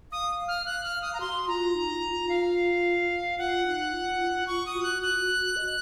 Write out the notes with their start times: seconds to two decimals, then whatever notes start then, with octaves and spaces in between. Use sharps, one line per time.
0.12 F5 D#6
0.48 F6
0.66 F#6
0.84 F6
1.02 D#6
1.13 A#5
1.20 F#4 C6
1.42 C6
1.48 F4 A#5
1.74 D#4
1.93 F4
2.12 F4
2.29 F5
3.38 F4 F#5
3.66 D#4
3.93 F4
4.20 F4
4.47 F4 C#6
4.66 D#6
4.75 F#4
4.83 F#6
5.02 F#6
5.56 D#5